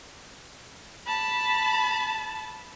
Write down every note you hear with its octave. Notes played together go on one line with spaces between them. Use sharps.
A5 B5